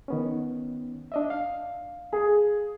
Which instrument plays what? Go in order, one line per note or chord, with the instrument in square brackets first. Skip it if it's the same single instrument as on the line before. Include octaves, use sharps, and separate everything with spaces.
[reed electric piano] D#3 B3 C#4
D4 D#5 E5
F5
[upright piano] G#4